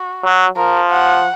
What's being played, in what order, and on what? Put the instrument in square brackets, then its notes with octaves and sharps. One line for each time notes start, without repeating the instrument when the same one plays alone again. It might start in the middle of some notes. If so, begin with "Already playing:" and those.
Already playing: [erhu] F#4
[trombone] F#3
[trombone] F3 [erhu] A#4
[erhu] F#5